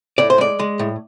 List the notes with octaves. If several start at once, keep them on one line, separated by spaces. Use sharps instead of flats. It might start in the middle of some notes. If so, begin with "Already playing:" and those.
A2 D5
C5
G#3 D5
G#3
A2